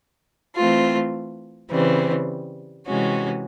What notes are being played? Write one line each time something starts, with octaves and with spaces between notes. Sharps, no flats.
E3 A3 C4 F4
C#3 E3 G3 C4
C3 E3 G#3 C#4 F#4